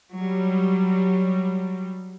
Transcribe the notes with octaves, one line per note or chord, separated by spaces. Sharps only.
F#3 G3